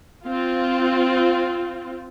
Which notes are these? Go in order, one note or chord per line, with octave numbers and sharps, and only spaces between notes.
C4 F4